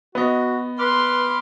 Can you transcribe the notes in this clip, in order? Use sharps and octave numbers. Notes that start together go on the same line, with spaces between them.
B3 F#4 D#5
B4 B5 C6 D6 F6